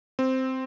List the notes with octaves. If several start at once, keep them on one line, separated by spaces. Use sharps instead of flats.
C4